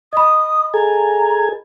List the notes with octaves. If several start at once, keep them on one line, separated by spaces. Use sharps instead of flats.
D#5 B5 D#6
G#4 A4 G#5 A#5